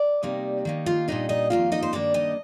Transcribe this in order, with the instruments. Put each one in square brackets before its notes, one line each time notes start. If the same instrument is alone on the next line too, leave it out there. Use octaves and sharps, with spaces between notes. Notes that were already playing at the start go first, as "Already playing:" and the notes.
Already playing: [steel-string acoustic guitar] D5
C3 G3 A#3 D#4
D#3 A#3 D#4
F4 F5
A#2 G3 D4 D#4 D#5
D#4 D#5
F2 D#3 A#3 D#4 F4 F5
D#4 D#5
C5
G2 D#3 A#3 D4 D5
D#4 D#5